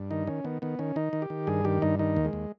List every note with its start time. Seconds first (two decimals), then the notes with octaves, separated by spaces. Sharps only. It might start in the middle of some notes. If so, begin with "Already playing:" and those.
Already playing: G2
0.11 D#3 D#4
0.27 D#3 C#4
0.44 D#3 B3
0.62 D#3 B3
0.79 D#3 C#4
0.96 D#3 D#4
1.13 D#3
1.22 G4
1.30 D#3
1.47 G2 G#4
1.65 D#3 G4
1.82 G2 D#4
1.99 D#3 D#4
2.16 D#2
2.25 G#3
2.33 D#2